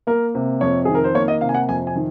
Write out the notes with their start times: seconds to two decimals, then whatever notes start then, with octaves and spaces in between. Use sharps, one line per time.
0.07 A#3 A#4
0.35 C3
0.61 F2 C#5
0.85 D#3 G#4
0.95 A#4
1.04 C5
1.15 A#3 C#5
1.28 D#5
1.41 C3 F5
1.49 G#5
1.54 F#5
1.68 F2 G#5
1.87 G#5
1.95 D#3